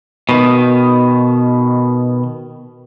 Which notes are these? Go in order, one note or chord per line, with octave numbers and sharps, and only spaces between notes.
B2 D#3